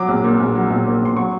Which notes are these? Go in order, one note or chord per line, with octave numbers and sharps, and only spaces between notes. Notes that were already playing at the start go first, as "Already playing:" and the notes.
Already playing: F#3 D6
A#1
A#2
A#1
F#3
A#1
A#2
A#1 C6
F#3 C#6